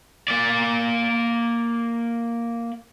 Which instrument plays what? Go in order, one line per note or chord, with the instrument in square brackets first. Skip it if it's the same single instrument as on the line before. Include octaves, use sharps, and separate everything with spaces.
[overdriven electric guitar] A#3 D5